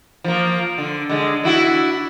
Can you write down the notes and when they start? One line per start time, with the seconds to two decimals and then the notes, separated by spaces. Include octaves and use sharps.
0.24 F3 A#3
0.78 D3
1.09 D3 G#3
1.44 D4 E4 F#4